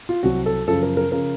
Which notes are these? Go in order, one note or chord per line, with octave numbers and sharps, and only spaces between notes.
F4
C2 C3 F#3 F#4
A4
F#2 C#3 F3 A4
A#4
A#4
C#3 F3 A#4